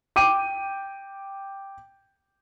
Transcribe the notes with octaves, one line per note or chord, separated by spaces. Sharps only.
G5 D6 D#7